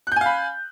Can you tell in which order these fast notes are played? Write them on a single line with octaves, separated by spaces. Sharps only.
F#6 G6 G#5 F5 B5